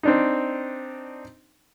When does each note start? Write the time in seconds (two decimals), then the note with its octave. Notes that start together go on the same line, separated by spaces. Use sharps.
0.03 C4 D4 D#4